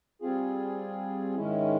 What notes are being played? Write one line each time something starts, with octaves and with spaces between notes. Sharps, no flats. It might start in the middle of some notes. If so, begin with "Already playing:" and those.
G3 C4 F4 G#4
G#2 D#3 G#3 C#4 E4